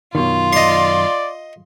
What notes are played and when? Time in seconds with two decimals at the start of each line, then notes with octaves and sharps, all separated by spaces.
0.15 F#2 B2 D#3 F4
0.53 D5 D#5 C6